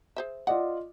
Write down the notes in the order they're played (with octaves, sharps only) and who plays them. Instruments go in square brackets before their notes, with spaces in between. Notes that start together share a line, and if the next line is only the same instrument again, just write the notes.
[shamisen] G#4 C5 E5
[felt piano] F4 D5 D#5 [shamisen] F#5